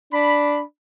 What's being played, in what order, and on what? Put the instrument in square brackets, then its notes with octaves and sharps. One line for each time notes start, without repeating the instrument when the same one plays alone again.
[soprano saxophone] D4 [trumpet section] B5